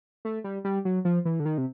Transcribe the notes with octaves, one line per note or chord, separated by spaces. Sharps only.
A3
G3
G3
F#3
F3
E3
D3
D#3
C3